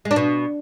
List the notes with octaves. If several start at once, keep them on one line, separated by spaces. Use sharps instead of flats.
G#3
D4
B2